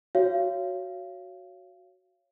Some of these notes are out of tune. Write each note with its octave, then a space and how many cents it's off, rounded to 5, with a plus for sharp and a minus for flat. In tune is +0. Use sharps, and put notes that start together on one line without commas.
F#4 +0 C#5 +5 F5 -30